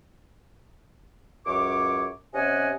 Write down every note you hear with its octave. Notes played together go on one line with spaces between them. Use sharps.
C#2 F#2 C#5 D6
C3 C#4 D#5 F#5 G#5